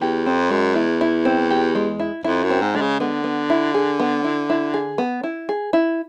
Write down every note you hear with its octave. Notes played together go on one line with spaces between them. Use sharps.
E2 G4
F2 C4
F#2 G#3
E2 E4
E4
C4
G4
G#3
E4
F2 E4
F#2
C4
G#2
D3 G#3
C#3
D3 B3
B3
E4
G#4
B3
E4
E4
G#4
B3
E4
G#4
E4